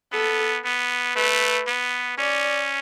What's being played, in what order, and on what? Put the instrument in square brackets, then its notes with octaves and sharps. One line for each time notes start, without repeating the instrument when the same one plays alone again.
[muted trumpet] B3 [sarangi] A4
[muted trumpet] B3
[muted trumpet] A3 [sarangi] B4
[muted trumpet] B3
[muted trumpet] C#4 [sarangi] D5